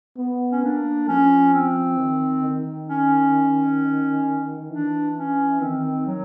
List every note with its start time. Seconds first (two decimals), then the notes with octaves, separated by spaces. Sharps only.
0.17 B3
0.52 C#4
0.63 A#3 D4
1.08 F3 C#4
1.54 C4
1.99 D#3
2.43 D#3
2.89 C#4
4.70 E3 D4
5.16 C#4
5.61 D#3 C4
6.06 F#3